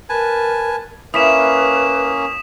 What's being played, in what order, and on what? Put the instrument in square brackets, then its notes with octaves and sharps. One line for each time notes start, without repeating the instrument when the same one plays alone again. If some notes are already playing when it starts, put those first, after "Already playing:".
[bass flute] A#4 [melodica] B4 G#5 A5
[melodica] A#3 C#4 [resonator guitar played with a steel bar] E4 [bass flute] B4 [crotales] D#6 B6 E7